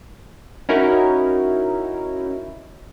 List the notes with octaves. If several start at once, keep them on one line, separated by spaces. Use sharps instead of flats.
C#4 D#4 E4 F#4 A#4